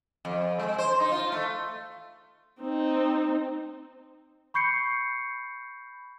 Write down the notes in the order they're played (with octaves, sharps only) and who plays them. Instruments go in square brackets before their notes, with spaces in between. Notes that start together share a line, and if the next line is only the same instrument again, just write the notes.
[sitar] F2
G#3
C5
D#4
F4
A3
[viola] C4 D#4
[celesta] B5 C#6 G6 C7 C#7